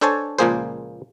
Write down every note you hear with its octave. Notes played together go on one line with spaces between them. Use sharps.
D4 A4 C5 C#5 G#5 A5
C#2 A#2 F3 A#3 G#4 C5